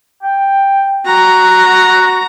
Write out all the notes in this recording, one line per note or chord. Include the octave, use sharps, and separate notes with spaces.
G5
F#4 A#5